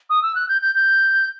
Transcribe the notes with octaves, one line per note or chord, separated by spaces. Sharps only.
D#6
E6
F#6
G6
G6
G6